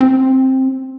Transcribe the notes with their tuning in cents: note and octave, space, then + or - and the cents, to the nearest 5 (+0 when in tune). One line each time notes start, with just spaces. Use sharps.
C4 +10